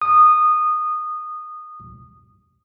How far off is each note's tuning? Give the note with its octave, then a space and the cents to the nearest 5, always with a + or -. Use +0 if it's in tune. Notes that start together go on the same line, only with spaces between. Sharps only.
D#6 -20